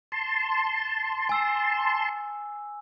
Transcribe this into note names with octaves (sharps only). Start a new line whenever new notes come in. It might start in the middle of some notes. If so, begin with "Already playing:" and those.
A5 C6
G#5 E6